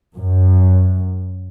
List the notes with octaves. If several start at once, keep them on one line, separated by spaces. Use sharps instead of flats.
F#2